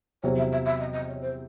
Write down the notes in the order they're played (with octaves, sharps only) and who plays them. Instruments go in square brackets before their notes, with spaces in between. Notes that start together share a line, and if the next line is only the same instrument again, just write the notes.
[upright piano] E2 C3 F#3 C4 [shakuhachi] C#5
[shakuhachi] E5
E5
E5
D#5
D#5
C#5
C5